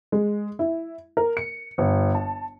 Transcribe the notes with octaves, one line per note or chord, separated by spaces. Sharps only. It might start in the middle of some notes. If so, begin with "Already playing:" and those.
G#3
E4
A#4
C#7
G1
A5